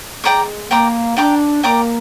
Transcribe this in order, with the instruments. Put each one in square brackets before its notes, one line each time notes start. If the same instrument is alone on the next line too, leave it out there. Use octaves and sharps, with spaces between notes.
[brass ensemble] G#3 [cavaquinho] D5 G5 A#5 D6
[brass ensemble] A#3 [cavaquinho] D5 G5 A#5 D6
[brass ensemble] D4 [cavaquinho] D5 G5 A#5 D6
[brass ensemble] A#3 [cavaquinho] D5 G5 A#5 D6